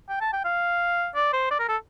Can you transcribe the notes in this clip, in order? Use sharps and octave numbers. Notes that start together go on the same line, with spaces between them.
G5
A5
G5
F5
D5
C5
D5
A#4
A4